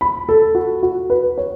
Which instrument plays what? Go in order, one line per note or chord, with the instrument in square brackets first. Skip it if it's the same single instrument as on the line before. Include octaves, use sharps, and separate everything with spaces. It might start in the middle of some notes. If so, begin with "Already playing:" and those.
[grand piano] B5
A4
F#4
F#4
B4
C#5